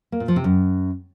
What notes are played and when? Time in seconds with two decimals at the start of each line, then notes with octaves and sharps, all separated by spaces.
0.12 A#3
0.20 A#2
0.28 F3
0.36 C3
0.44 F#2